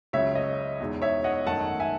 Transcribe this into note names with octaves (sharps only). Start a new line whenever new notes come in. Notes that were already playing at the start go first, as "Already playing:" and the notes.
C#2 C#3 F#3 C#5 E5
D#5
E2 B2 G#3 D#4
C#5 E5
D#5 F#5
G#1 F#2 D#3 A3 D#4 F#5 A5
E5 G#5